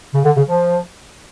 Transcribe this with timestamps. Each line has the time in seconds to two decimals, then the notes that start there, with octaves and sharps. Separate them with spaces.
0.14 C#3
0.25 D3
0.36 C#3
0.48 F3